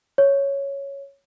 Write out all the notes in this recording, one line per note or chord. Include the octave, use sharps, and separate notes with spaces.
C#5